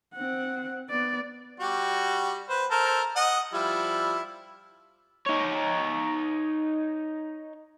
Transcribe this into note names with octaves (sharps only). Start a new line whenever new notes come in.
C4 F#5
B3 D5
G3 F#4 G4
B4 C5
A4 A#4 C5
D#5 F#5
F3 G3 E4
D#4 C#5